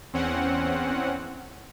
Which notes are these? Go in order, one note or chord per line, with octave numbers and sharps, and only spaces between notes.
E2 C4 C#4 F#5